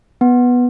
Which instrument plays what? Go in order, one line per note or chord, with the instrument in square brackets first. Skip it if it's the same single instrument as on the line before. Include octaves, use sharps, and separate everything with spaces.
[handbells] B3